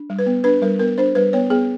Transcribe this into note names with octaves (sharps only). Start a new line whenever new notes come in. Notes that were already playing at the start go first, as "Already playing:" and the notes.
Already playing: D4
G3
B4
B3
D4 B4
G3 A#4
B3 A#4
D4 C5
G3 B4
B3 C#5
B3 G#4